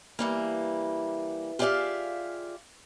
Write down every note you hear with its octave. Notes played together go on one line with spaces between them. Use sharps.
E3 G3 A#3
F4 G4 G#4 D5 E5 F5